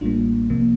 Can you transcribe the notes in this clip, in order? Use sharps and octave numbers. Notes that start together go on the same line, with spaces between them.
A1 A2 G3 A#3 D4 F4
C2 C3 F3 A#3